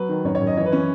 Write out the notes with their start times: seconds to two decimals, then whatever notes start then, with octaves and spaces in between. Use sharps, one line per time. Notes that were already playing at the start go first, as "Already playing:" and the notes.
Already playing: F#3 B4
0.09 D#3
0.24 F#2 C#5
0.35 C#5
0.41 F#2
0.47 D#5
0.57 E3 C#5
0.66 B4
0.72 E3 C#4